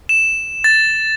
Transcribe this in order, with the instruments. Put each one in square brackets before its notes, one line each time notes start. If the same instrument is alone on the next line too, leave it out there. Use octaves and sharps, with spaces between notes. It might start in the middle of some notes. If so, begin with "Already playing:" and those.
[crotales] E7
A6